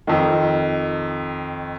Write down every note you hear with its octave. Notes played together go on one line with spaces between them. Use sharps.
F2 D#3